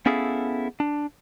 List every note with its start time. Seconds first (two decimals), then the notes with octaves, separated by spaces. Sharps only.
0.06 B3 C#4 E4 G#4 A4 F5
0.80 D4